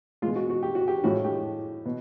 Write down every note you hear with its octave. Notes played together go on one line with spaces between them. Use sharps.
B2 G#3 F4
F#4
F#4
G4
F#4
G4
A2 F3 G#3 F#4
G4
B2